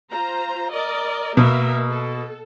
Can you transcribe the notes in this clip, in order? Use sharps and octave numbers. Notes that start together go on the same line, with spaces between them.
F4 C5 A#5
A#4 D5 D#5
B2 A#3 A#4 E5
A4